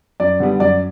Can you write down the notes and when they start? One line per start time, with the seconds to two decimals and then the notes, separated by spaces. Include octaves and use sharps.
0.20 F#2 D5
0.40 D3 G3 B3
0.60 F#2 D5